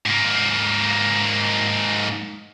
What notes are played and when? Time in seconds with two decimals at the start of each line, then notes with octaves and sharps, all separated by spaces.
0.06 G#2 A#3